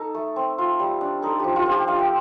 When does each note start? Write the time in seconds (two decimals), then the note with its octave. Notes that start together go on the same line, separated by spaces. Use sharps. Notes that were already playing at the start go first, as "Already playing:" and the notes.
Already playing: D#4 A4
0.14 A3
0.36 C4
0.58 F4
0.80 G3
1.01 D4
1.22 D#4 A4
1.39 F3 G4
1.56 F4
1.66 C4
1.71 G4
1.88 D4 F5
1.99 G5